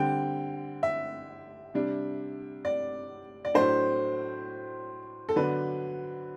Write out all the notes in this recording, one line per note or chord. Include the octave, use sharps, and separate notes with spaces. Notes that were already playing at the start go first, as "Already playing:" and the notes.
Already playing: D3 G3 C4 G5
E5
C3 G3 D4
D5
D5
A2 F#3 A3 D4 C5
A4
D3 F#3 B3 D4 B4